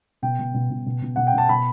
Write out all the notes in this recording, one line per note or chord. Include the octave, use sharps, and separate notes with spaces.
B2 G5
B2
B2
B2
B2
B2
B2 F#5
G5
B2 A5
B2 B5